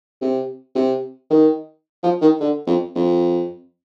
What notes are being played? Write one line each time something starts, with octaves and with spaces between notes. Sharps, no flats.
C3
C3
D#3
F3
D#3
D3
F2
F2